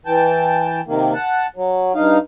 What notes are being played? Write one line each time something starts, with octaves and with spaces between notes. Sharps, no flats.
E3 G5 A5
C3 D#3 A#3
F#5 A5
F#3
G2 D#4 F5